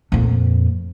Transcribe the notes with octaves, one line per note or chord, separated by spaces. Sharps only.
F2 A#2